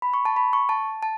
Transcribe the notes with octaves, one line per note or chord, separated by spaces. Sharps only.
B5
C#6
A5
B5
C#6
A5
A5